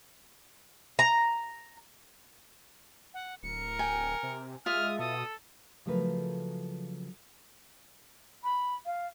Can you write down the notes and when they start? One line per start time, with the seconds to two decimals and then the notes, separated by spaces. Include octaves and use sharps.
0.99 A#5
3.14 F#5
3.43 D1 A#4 C#7
3.79 G5 G#5
4.23 C3
4.66 G#3 F4 E5 D#6 F6
4.99 B2 A4 D#6
5.86 C#3 F3 F#3 A3 A#4 B4
8.43 B5
8.86 F5